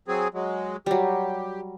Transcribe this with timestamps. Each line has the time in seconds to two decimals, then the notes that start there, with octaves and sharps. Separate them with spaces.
0.08 F#3 C4 G#4
0.34 F#3 G#3
0.86 F#3 G3 G4